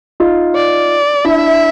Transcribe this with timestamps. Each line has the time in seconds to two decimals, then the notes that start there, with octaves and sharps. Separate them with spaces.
0.20 D#4 F4
0.55 D5
1.25 D4 E4 E5